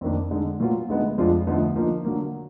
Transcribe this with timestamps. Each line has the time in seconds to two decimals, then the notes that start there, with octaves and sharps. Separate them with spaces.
0.01 F2 D#3 A#3 D4
0.31 D3 G#3 D#4
0.60 A#2 F#3 B3 F4
0.88 D2 D3 G#3 B3 D#4
1.18 F2 F3 G#3 D4 F4
1.47 D2 D3 F3 B3 D#4
1.75 D3 F3 A#3 D#4
2.05 D3 F#3 A#3